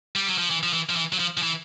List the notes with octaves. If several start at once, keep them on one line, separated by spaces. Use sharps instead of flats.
G3
F#3
F3
E3
F3
E3
F3
E3
F#3
F3
F3
E3